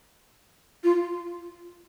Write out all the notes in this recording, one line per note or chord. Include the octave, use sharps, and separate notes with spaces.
F4